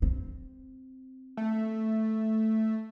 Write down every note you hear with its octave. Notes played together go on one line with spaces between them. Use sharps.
C4
A3